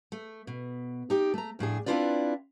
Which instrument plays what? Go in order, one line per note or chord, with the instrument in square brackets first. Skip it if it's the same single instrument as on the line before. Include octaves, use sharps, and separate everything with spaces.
[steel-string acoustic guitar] A3
B2
D#4 G4
A3 A#5
F2 A2 D4 G#4
C4 D4 E4 F4 B4 D5